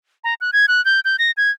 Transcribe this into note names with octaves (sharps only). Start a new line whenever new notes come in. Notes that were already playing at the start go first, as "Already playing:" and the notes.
A#5
F#6
G#6
F#6
G6
G6
A#6
G#6